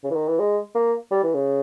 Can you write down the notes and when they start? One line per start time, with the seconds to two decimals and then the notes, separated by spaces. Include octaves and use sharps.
0.03 C#3
0.10 E3
0.15 D#3
0.28 E3
0.39 G#3
0.75 A#3
1.11 G3
1.23 E3
1.34 C#3